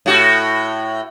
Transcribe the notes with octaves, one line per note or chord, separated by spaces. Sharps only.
A2 F#4